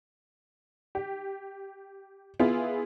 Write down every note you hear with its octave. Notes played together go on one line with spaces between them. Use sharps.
G4
B3 E4 F4 G#4